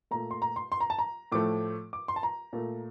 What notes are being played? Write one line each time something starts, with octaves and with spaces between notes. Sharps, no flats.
A#2 A3 A#5
C6
A#5
C6
C6
A#5
A5
A#5
A2 F3 A3 D6
D6
C6
A5
A#5
A#2 A3